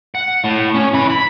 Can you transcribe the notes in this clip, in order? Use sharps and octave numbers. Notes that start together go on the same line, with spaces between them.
F#5
A2
C#4
E3 B5
B5